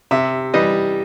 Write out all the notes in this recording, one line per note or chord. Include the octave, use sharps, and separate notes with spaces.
C3 E5
E3 G3 D#5